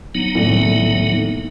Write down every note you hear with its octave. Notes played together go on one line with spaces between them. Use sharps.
F#3 B3 D#4
D#1 C2 A2